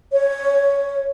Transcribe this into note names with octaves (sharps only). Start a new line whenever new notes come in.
C#5